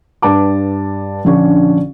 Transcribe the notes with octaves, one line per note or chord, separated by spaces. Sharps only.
G2 B4 A5 D6
A#1 D3 C#4 D4 C#6